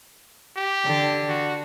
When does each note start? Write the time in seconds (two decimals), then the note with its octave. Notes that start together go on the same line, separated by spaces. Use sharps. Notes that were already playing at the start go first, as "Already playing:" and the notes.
0.56 G4
0.85 D3
1.29 F#4